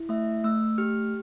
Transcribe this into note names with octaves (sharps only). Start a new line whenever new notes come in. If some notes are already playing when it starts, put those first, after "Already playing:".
Already playing: E4
A3 E5
A3 E6
G4 F6